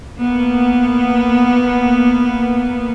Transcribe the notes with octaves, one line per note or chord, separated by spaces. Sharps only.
A#3 B3